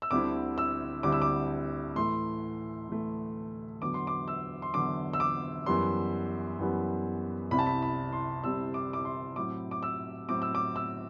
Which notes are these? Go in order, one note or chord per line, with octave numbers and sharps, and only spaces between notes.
E6
D2 D3 G3 C4 E4 D6
E6
D2 D3 G3 C4 E4 D6
E6
D6
A2 E3 A3 C6
A2 E3 A3
E2 D3 F#3 D6
C6
D6
E6
C6
E2 D3 F#3 D6
E6
D6
F#2 E3 G3 B3 C6
F#2 E3 G3 B3
C2 C3 G3 C4 E4 B5
A5
B5
B5
C6
C2 C3 G3 C4 E4 E6
D6
D6
C6
A2 F#3 C4 E4 D6
D6
E6
A2 F#3 C4 E4 D6
E6
D6
E6